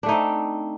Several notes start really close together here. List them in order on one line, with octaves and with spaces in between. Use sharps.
D4 A3 D#4 C4